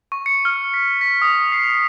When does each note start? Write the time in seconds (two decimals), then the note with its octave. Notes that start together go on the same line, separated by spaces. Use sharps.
0.12 C#6
0.26 C#7
0.45 F6
0.74 B6
1.01 B6
1.22 D#6
1.52 C7